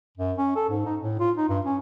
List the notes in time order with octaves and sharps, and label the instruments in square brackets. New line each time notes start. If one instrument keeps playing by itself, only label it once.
[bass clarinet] F#2
C#4
A4
G#2
D#4
A2
F4
D#4
G2
C#4